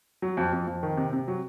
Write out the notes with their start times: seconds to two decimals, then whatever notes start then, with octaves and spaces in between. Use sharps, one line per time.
0.22 F#3
0.37 F2
0.53 F2
0.67 F2
0.83 D#3
0.97 C3
1.13 C3
1.28 F#3